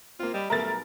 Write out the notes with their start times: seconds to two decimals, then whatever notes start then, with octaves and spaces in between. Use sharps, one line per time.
0.19 A#3 C4 F4
0.34 G3 D#5 B5
0.50 B1 B2 G3 A3 A#4 A6